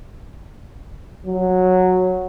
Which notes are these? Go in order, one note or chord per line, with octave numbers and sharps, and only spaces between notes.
F#3